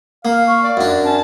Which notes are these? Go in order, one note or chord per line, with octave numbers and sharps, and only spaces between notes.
A#3 F5
C#6
D5
F#2 D4
C#4 A5